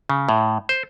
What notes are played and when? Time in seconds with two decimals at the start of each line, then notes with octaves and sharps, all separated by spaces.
0.10 C#3
0.29 A2
0.69 C5